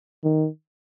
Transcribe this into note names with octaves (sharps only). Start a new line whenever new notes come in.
D#3